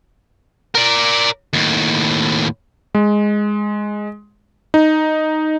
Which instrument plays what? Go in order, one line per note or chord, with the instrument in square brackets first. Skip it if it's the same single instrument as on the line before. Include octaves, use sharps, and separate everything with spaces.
[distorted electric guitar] A#4 D5
D#2 A2
[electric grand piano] G#3
D#4